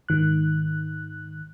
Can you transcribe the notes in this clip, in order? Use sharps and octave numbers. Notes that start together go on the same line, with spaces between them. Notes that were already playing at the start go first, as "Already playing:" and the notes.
G#2 D#3 F#6